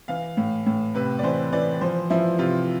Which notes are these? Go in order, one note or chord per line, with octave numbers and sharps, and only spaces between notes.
E3 F5
A2
A2
C3 B4
D5
E3 C5
E3 D5
F3 C5
F3 E4
C3 F4